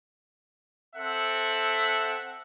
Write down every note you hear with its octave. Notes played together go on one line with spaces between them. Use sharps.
C4 A4 E5 F#5